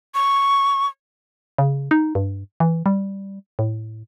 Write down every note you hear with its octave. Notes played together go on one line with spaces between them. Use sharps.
C#6
C#3
D#4
G2
E3
G3
A2